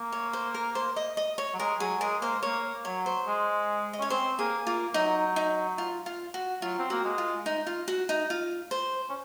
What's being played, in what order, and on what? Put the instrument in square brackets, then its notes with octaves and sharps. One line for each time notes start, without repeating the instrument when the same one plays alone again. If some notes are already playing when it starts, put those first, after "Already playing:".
Already playing: [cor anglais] A#3
[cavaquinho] C#5
C5
A#4
C5
D#5
D#5
C#5
[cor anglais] F#3
[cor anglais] G#3 [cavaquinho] A#4
[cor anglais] F#3 [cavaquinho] G#4
[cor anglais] G#3 [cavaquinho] A#4
[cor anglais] A#3 [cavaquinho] C5
[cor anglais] A#3 [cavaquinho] C#5
[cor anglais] F#3 [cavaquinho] C#5
[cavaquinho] C5
[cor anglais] G#3
[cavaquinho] D#5
[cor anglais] C#4 [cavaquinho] C#5
[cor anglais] C4 [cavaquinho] C5
[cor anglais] A#3 [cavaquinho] G#4
[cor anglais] A#3 [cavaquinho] F4
[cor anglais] F#3 [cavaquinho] D#4
[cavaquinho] D#4
F4
F4
F#4
[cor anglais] F#3 [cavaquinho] F4
[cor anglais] C4
[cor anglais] A#3 [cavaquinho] F#4
[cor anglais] G#3
[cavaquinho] F4
D#4
F4
F#4
D#4
F4
C5
[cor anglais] C#4